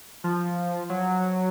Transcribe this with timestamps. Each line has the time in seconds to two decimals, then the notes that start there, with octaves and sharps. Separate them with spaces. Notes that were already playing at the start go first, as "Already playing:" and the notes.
0.24 F3
0.90 F#3